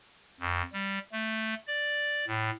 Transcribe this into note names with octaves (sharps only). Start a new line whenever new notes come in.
F2
G3
A3
D5
A2